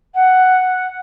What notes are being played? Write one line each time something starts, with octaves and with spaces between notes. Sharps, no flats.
F#5